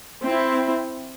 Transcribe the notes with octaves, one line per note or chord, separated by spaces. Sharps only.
C4 E4